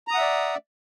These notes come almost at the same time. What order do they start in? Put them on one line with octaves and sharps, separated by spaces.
A#5 D#6 F#5 E5 D5